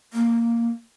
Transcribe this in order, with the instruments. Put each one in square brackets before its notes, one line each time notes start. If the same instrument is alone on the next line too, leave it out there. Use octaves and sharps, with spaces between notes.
[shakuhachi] A#3